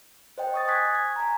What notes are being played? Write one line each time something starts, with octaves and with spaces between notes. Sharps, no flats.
C5 D#5 G5
C#6 D#6 A6
G#5 C#6 D#6 F#6 G#6 B6
G#6
G#5 A#5